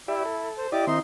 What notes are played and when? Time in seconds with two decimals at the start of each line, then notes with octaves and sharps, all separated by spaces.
0.08 E4 G4 D5 E5
0.25 A4
0.58 C5
0.72 E4 G4 D5 D#5 D6
0.87 D#3 C4 D#4 E4 C6